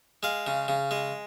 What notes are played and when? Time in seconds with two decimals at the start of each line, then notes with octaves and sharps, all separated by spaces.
0.23 G#3 F5
0.47 C#3
0.68 C#3
0.91 G#3